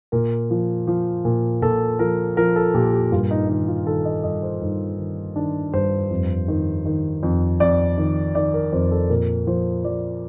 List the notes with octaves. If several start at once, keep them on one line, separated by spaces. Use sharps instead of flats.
A#2 A#4
F3
F3
A#2
A#2 A4
F3 A#4
F3 A#4
A4
A#2 G4
G4
G2 F4
D#4
D#3 D#4
F4
D#3 A4
D#5
G2 D#5
C5
G2 D#4
D#3
D#3 D4
G2 C5
F2
D#3
D#3
F2
F2 D5
D#3
D#3 D5
A#4
F2 C5
A4
A#2 A#4
F3 C5
F3 D5